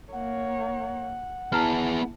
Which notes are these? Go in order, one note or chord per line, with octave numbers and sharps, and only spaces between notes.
A#3 C#5 F#5
B3 E4 G#4 A5 A#5 F6